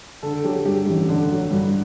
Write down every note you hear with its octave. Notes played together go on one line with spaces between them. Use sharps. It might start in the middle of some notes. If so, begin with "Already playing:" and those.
D3 A4
F#3 G4
G2 G4
A1
D3
F#3
G2